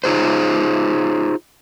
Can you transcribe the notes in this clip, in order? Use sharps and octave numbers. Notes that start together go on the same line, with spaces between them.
D#4 F4 G#4 C5